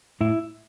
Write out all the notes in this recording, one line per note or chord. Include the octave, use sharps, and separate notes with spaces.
A2 E4